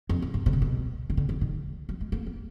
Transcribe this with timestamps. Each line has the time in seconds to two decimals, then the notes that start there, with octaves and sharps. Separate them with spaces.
0.09 F2
0.22 F#2
0.34 G#2
0.46 B2
0.53 D3
0.62 B2
1.10 D#3
1.17 D3
1.29 D#3
1.41 D#3
1.89 F#3
2.01 G#3
2.12 A#3
2.26 B3